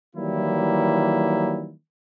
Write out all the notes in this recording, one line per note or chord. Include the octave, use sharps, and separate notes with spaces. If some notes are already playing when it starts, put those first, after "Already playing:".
D#3 E3 F#3 G3 A#3 E4